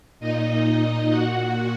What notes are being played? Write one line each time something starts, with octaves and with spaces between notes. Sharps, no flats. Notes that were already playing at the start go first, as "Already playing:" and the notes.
A#2 D#4 D#5
F#4 F#5